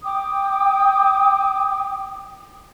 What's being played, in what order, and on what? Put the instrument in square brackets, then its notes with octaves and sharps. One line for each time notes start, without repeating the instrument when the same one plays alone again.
[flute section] G5 D6 D#6